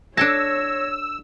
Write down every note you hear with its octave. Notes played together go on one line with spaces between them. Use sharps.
D4 A4 C#5 A5 E6 G#6 A#6